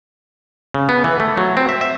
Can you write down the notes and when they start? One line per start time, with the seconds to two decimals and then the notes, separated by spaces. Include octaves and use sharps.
0.74 C#3
0.89 B3
1.04 E3
1.20 A3
1.37 F#3
1.57 C4
1.69 E5
1.81 E5